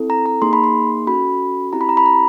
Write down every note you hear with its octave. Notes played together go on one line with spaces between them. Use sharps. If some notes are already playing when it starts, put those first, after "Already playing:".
Already playing: C4 E4 A4
A#5
A#5
A#3 D#4 G#4 C6
B5
C6
C#4 F#4 A4 B5
C4 E4 G4 A#5
B5
A#5
B5
A#5